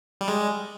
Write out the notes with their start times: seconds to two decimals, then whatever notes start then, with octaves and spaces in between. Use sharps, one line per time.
0.21 G3
0.28 G#3